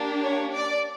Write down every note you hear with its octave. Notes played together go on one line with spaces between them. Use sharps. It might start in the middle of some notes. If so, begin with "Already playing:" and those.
Already playing: A#3 D4 G4
C#5
D5